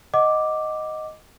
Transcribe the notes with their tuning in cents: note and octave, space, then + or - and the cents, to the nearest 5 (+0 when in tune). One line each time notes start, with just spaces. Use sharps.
D#5 +0 F#5 +0 D6 +0